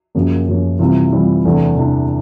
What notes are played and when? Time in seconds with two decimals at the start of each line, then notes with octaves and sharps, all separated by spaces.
0.15 F#2 C#3 F3 A#3 C#4
0.47 F#2 C#3 F3 A#3 C#4
0.79 C3 E3 G3 C4 F4
1.12 C3 E3 G3 C4 F4
1.45 E2 C3 E3 A3 D4
1.77 E2 C3 E3 A3 D4